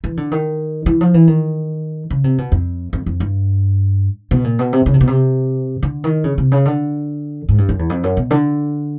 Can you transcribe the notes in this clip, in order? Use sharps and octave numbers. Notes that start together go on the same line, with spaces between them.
E3
D3
D#3
E3
F3
E3
D#3
C#3
C3
B2
F2
F2
F2
G2
B2
A#2
B2
C3
C#3
C3
B2
C3
D3
D#3
C#3
C3
C#3
D3
G#2
G2
F#2
E2
F2
F#2
B2
D3